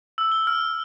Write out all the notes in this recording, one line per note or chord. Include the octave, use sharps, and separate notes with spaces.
E6
G7
F6